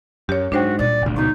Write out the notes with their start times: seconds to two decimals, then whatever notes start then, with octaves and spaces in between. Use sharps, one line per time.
0.29 F#2 G4 C#5
0.52 G#2 F#3 D4 F#4 C5 G5
0.79 A#2 G3 D5
1.02 F1 D2
1.16 C#2 B2 D#4